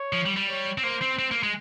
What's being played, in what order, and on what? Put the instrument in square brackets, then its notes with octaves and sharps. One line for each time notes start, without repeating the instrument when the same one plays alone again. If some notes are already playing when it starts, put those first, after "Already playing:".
Already playing: [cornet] C#5
[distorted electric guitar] F3
G3
G3
[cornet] C#5
[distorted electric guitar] C4
[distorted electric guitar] A#3 [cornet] C5
[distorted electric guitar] C4
C4
A#3
G#3